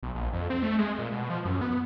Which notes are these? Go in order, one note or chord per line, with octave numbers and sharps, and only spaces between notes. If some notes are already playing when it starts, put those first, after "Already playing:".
B1
A#1
F2
C4
A3
G#3
A#2
B2
F3
F#2
B3